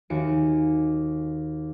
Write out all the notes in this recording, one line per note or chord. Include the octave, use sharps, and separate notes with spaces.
D#2 F#4 G#5 C#7 D7